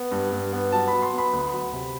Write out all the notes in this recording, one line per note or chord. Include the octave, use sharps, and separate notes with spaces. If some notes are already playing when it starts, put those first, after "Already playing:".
Already playing: B3
G2
G2
B3
F#3 A5
F#3 B5
C6
B3
B5
D2
F#3
C3